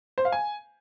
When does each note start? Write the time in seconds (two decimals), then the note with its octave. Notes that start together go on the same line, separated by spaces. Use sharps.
0.18 C5
0.25 F5
0.32 G#5